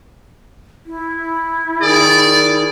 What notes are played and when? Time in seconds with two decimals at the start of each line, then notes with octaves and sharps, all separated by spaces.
0.86 E4
1.81 D#3 G#4 D5